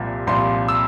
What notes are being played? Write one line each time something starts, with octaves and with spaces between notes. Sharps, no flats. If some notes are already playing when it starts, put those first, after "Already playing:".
Already playing: C2 A#2 F3
C2 A#2 F3 C6
E6